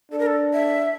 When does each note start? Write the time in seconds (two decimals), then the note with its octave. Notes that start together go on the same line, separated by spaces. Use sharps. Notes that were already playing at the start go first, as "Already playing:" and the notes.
0.11 D4 A4
0.19 A#4
0.26 A4
0.53 E5